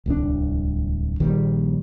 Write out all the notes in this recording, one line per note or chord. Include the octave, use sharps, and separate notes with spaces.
D1 C2 D3 D4
A#1 D#3 G3